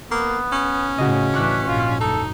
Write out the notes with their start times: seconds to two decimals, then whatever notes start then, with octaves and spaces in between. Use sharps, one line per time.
0.11 A#3 B3
0.52 C#4
0.98 A2 C#3 F#4 D#5
1.34 A2 E3 D4 C#6 F#6 B6
1.67 A#1 G#2 F4
2.00 F#1 D#4 A4